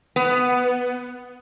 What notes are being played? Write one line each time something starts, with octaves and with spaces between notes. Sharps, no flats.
B3